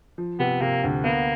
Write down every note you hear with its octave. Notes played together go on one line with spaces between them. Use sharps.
F3
C3 B3
C3 A#3
D2
A#3 B3